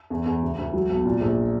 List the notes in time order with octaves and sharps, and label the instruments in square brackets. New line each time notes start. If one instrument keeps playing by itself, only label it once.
[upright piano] E2
E2
D2
D2
F#3
B1
A#2
A#1